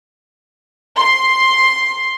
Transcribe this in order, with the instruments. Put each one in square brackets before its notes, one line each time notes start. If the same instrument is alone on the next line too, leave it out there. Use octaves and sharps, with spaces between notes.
[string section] C6